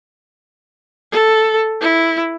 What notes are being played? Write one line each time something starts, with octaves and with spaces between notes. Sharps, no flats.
A4
E4